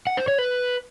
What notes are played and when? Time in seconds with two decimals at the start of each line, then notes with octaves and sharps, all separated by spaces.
0.07 F#5
0.17 C5
0.28 C#5
0.39 B4